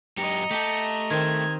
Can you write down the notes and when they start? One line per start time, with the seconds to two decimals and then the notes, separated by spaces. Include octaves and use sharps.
0.17 F#2 G4 D#5 A#5 C#7
0.51 A3 G4 A4
1.10 D#3 C4 G#6